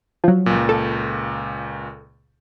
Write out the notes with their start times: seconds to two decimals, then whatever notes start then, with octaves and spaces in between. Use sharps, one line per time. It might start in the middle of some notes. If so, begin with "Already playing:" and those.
0.24 F3 F#3
0.46 C#2 A#2
0.69 A4